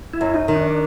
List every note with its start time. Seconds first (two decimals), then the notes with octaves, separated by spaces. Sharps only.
0.13 E4
0.21 F#2
0.34 D#4
0.48 D#3
0.56 D4